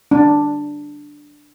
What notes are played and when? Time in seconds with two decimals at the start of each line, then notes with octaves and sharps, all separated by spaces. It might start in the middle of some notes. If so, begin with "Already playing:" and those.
0.11 D4